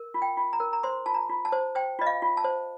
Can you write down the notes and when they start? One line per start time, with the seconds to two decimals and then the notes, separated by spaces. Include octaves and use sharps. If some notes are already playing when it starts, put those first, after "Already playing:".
Already playing: A#4
0.14 F4
0.22 G5
0.37 F4
0.53 A#5
0.60 A#4
0.73 A#5
0.83 C5 C6
1.06 F4 A5
1.14 A#5
1.29 F4
1.45 A5
1.52 C5
1.75 C5 G5
1.99 F4 D#5
2.06 F5
2.22 F4
2.37 A5
2.44 C5